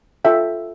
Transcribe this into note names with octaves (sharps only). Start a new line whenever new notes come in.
F4 A4 E5 G5